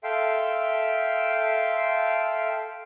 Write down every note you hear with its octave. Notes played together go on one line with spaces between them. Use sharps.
A4 E5 F5 G5 C6